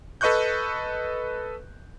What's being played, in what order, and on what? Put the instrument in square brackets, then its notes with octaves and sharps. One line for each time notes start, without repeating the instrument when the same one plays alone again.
[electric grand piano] A4 B4 D#5 C#6 F#6 G6